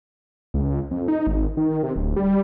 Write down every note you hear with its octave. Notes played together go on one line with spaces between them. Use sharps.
C#2
F2
D#4
G#1
D#3
C3
D1
G3